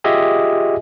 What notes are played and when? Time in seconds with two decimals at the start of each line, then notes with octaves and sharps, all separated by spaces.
0.04 F4 G4 G#4 D#5 E5 G#5